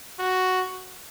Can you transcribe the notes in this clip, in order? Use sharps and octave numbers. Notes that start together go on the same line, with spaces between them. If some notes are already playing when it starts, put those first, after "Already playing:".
F#4